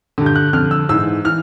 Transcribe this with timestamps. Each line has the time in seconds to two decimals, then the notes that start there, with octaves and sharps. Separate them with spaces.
0.18 G2 D3
0.26 G6
0.36 F#6
0.53 F2 D3 F6
0.71 E6
0.89 G#2 E3 E6
1.25 E3 F6